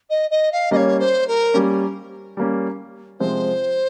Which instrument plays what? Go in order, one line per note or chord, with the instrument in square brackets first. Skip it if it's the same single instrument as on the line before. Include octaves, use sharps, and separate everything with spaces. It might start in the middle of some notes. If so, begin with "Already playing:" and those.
[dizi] D#5
D#5
F5
[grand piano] G3 A#3 C#4 [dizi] C#5 D#5
[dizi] C5
A#4
[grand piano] G3 A#3 C#4
G3 A#3 C#4
[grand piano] C3 F3 G#3 C4 [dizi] C5